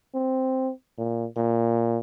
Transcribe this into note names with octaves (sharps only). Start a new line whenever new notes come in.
C4
A#2
A#2